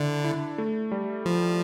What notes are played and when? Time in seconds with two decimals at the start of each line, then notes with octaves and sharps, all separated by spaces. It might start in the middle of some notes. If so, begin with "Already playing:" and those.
Already playing: D3 D4 E4
0.24 E4
0.58 A3
0.92 G3
1.26 F3